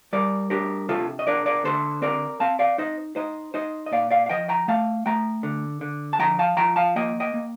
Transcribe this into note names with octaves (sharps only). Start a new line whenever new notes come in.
G3 A#4 D5
D4 G4 A#4
C3 F4 A4
D#5
D4 A#4 D5
A#4 D5
D3 A4 C5
C4 A#4 D5
C4 F5 A5
D5 F5
D#4 C5 D#5
D#4 C5 D#5
D#4 C5 D#5
D#5
A#2 D5 F5
D5 F5
F5
F3 D#5 G5
G5 A#5
A3 F5 A5
A3 G5 A#5
D3
D3
A5
F3 G5 A#5
F5 A5
F3 G5 A#5
F5 A5
A#3 D#5 G5
D#5 G5
A#3